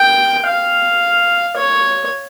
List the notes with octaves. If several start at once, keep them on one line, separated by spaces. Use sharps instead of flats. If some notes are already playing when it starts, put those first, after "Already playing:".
Already playing: G5
F5
C#5